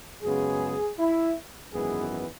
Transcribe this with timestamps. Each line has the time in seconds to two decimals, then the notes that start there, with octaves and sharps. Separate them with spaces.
0.23 F#2 C#3 G#3 B3 G#4
0.99 E4
1.72 G#1 F#2 E3 G#3 B3 G#4